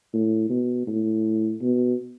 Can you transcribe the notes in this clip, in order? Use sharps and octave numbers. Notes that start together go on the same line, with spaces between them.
A2
B2
A2
B2